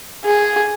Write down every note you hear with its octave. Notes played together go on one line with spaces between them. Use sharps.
G#4